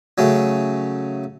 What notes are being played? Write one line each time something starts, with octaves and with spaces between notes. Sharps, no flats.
C#3 F#3 A3 C#4